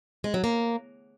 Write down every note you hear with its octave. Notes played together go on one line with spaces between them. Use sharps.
G#3
F#3
A#3